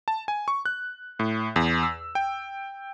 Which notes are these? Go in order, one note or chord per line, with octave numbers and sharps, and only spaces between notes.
A5
G#5
C#6
F#6
A2
E2
E6
G5